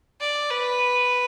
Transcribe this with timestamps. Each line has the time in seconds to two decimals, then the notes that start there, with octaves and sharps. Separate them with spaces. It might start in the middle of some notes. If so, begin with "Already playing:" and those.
0.21 D5
0.51 B4